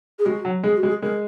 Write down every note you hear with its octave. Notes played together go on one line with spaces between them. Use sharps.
G#4
G#3 F#4
F#3
G#3 G#4
F#4
G#3
G#4
G#3 A#4